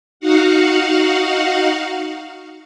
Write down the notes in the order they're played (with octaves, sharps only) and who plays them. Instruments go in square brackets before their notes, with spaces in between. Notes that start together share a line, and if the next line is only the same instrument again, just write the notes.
[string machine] D#4 F#4 F5 F#5